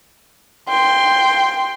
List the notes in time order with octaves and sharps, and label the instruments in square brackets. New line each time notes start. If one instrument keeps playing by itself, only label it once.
[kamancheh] G5 C6